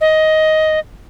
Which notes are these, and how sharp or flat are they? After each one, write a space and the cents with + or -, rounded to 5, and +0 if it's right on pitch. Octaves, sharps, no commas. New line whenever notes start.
D#5 +10